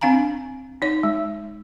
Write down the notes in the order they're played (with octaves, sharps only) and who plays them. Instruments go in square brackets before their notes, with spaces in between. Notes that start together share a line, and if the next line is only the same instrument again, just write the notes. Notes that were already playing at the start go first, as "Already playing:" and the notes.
[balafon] C4 D4 F5 G#5 A#5
D#4 C#5
G#3